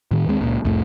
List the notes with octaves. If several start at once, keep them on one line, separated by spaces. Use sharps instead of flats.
A2 D#3
D#2 G#3 C4
C#2 A#2
C2 F2 A2 A3